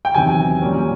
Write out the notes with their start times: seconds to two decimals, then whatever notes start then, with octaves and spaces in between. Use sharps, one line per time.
0.05 G5
0.14 E2 C3 D#3 F#3 G#5
0.61 A#2 G3 A#3 C#4